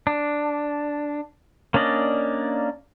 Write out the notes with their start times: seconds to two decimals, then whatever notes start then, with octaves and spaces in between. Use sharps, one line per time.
0.07 D4
1.74 A#3 C#4 D4 D5 D#5